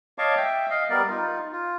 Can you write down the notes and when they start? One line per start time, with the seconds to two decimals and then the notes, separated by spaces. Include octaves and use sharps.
0.18 C#5 D#5 F5 A5 C#6 D6
0.37 E5 G5
0.70 D#5 F5
0.90 G3 B3 A#4 D5
1.10 D#4 F4
1.52 F4